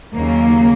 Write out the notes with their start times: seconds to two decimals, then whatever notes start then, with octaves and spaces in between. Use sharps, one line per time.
0.13 D#2 C#3 F#3 A#3